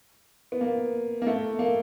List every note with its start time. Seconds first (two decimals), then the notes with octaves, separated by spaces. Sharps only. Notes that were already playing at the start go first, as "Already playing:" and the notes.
0.52 B3
0.61 A#3
1.22 A#3
1.27 A3
1.59 A#3